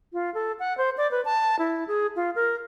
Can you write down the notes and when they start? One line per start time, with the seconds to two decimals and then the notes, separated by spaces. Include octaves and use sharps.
0.13 F4
0.34 A4
0.59 F#5
0.77 C5
0.97 D5
1.11 B4
1.25 A5
1.59 E4
1.87 G#4
2.16 F4
2.35 A#4